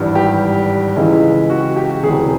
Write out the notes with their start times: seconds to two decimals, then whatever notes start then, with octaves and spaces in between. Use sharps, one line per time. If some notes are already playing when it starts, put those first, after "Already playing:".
Already playing: G#1 G2 E3
0.15 G4
0.96 C#2 C#3 E3 G#3
1.50 F#4
1.76 G4
2.03 E1 D2 C3 E3 G#4